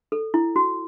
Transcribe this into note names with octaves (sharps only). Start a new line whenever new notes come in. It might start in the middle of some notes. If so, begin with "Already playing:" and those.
A4
E4
F#4